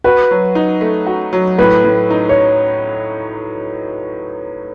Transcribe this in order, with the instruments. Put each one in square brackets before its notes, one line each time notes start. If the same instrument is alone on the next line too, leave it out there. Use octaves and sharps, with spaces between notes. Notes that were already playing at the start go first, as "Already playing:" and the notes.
[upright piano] F#4 [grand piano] B4
[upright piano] F#3
D#4
A3
F#4
F#3
[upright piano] A2 [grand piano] B4
[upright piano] A2
D#4
[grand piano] C#5